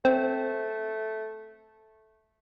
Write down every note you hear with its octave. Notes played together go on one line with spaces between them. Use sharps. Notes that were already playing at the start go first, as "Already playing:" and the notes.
A3 C4